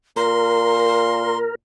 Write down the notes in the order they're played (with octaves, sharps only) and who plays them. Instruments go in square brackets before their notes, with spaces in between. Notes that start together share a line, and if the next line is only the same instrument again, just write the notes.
[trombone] A#2 [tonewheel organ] A#4 [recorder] C6